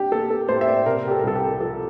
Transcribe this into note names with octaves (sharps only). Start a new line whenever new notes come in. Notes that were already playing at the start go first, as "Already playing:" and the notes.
Already playing: D4 G4
A#3 A4
A4
A2 C5
E5
D5
C3 A#4
G4
A4
A#4
C2 A4
G4
F3 A4